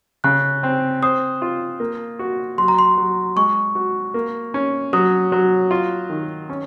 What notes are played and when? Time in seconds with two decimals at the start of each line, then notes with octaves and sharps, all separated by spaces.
0.24 C#3 F#6
0.63 C4
1.03 C5 D#6
1.42 F4
1.80 A#3
2.19 F#4
2.58 F#3 C6
2.68 A#5
2.79 C6
2.98 F#3
3.36 G#3 C#6
3.75 F#4
4.14 A#3
4.54 C#4
4.93 F#3 D#6
5.32 F#3
5.71 F4
6.10 D#3
6.49 C#4